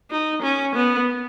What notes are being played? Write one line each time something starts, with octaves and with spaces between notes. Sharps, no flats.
D#4
C#4
B3